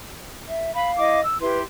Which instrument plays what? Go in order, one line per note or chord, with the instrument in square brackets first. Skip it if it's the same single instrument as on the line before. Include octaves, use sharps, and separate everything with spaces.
[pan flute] E5
[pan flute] F5 [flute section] B5
[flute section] E4 D#5 D6
E6
[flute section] E4 G4 C6 [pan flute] B4